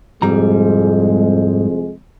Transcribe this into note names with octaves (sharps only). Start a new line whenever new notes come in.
C2 F2 G#2 G3 G#3 A#5